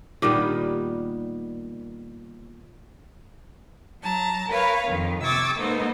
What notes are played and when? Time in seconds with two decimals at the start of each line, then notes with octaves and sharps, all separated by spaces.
0.22 A#2 D#3 G3 B3
4.02 F#3 A5 A#5
4.49 A#4 B4 C#5 F5 B5
4.87 F2 D#3
5.23 C3 C#6 D6 E6 G#6 A6
5.57 G#3 A#3 B3 D#4 A4 C5